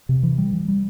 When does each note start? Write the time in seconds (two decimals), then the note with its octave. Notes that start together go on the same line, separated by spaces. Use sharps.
0.09 C3
0.23 E3
0.38 G3
0.53 E3
0.68 G3